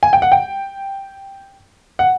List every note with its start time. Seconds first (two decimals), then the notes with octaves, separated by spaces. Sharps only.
0.03 G#5
0.13 G5
0.22 F#5
0.32 G5
1.99 F#5